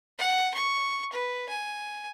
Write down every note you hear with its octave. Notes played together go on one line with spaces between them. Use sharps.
F#5
C#6
B4
G#5